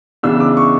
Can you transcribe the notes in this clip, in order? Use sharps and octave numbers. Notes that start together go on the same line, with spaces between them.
C#3 E3 B3 D4 E6
D6
C#6